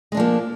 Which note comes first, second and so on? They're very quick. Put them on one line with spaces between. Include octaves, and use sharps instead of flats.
G#3 D4 F3 A#3